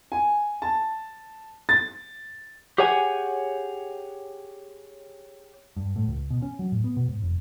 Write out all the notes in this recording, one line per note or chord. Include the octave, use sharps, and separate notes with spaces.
G#5
A5
A6
G4 G#4 C#5 F#5 G#5
G2
A2
C#2
B2
C#4
F#3
A2
B3
B2
G#2
F1